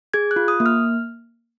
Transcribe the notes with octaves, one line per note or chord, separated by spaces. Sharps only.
G#4 G#6
F#6
F4
D#6
A#3
F6